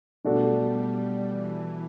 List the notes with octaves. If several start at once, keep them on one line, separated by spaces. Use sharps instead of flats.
B2 G3 A3 D4 F#4 A4
G3
E3